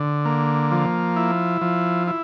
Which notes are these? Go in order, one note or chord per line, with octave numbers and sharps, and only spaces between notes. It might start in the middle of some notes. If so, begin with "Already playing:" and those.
Already playing: D3
A#3
F3
E4
F3
E4